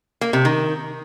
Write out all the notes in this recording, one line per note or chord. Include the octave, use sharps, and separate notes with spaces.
A#3
C3
D#3